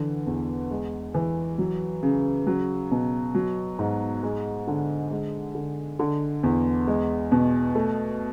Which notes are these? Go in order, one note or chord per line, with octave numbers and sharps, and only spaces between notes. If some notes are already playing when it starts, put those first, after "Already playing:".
Already playing: D3 E3
E2
G#3
E3
F#3
C#3
F#3
B2
F#3
G#2
G#3
D3
G#3
D3
D3
E2
G#3
B2
A3